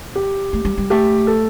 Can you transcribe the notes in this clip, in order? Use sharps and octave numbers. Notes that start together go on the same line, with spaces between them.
G4
A3
G3
G3
A3 G4
A4